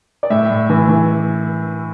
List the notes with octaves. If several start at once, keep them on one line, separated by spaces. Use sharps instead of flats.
D5
A2 E5
A2
E3
E3